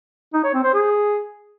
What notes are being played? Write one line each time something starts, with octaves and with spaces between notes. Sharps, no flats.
D#4
C#5
C4
C5
G#4